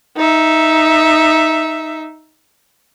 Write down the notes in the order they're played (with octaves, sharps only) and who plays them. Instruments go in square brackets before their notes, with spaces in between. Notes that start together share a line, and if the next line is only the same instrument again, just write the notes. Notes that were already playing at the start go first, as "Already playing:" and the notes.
[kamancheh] D#4 E5